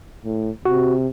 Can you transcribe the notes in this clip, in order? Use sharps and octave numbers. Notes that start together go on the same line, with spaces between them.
A2
C3 F#4